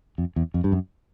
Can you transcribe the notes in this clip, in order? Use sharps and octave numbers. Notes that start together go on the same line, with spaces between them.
F2
E2
F2
G2
F#2